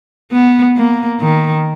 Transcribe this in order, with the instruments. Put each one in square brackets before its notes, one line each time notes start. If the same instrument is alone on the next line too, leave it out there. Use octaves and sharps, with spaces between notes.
[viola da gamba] B3
A#3
D#3